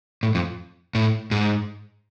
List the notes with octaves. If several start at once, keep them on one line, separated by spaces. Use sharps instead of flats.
A2
F2
A2
G#2